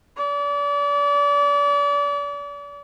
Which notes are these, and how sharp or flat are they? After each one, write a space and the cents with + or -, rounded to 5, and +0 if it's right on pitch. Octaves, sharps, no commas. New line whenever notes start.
D5 -35